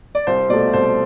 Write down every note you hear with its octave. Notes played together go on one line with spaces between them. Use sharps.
D5
C2 C5
B2 A3 D5
C2 C5